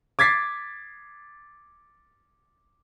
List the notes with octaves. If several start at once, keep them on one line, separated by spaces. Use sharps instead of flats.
D6 G#6 A6 B6 C7